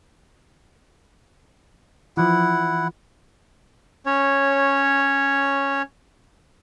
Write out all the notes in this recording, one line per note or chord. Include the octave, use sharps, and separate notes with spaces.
E3 F3 E4 F#5
C#4 C#5